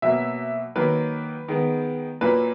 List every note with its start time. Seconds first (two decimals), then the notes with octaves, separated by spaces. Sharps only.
0.02 B2 F#3 A#3 E5
0.76 D#3 F#3 A#3 B4
1.48 D#3 G#3 B3
2.21 A#2 F#3 A#3 B4